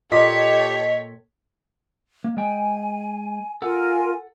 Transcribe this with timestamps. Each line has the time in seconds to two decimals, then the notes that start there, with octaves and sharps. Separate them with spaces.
0.12 A#2 G4 A4 C#5 D#5 G5 B6
2.24 A#3
2.37 G#3 G5 G#5
3.62 F4 A4 A#4 F#5 G#5